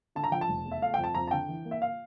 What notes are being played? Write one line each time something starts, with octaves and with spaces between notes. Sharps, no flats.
D3 A5
A#5
F3 G5
A5
F1
E2
E5
A3 F5
F2 G5
A5
F2 A#5
A5
D3 G5
E3
A#3
E5
F5